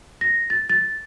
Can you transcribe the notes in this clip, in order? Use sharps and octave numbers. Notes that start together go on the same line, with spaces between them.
A#6
A6
A6